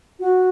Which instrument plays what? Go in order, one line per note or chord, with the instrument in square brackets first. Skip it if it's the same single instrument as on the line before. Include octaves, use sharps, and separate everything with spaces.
[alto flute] F#4